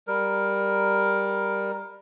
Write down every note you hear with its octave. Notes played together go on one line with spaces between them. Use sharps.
G3 A#4